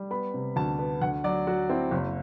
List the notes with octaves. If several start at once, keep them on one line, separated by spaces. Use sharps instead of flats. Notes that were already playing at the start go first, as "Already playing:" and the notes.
Already playing: G3
B3 B5
C3
D2 A5
B3
D2 F#5
F#3 D5
F#3 F#4
C4 E4
F#1